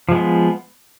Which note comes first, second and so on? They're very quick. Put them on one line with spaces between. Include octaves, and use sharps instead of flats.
F3 G#3 B3